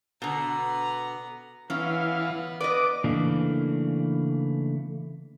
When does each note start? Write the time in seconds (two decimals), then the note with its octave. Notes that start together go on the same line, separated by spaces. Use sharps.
0.22 B2 D3 B3 A#5
1.70 E3 B3 C#4 F5
2.61 B4 D5 D#5 D6
3.04 C#3 E3 A3 A#3 D4